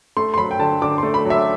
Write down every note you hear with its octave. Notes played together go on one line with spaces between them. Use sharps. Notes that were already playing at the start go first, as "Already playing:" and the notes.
A3 C6
C6
F#3 B5
G5
D3 A5
D3 D6
A3 C6
B5
F#3 E5